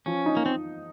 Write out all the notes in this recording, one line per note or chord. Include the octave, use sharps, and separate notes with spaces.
F3 C#4
D#4
A#3
C4